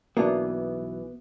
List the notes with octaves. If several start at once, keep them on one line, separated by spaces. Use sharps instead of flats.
B1 E3 A#3 B3 D4 F#4 E5 D6